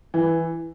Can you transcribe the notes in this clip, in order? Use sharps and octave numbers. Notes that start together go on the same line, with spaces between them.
E3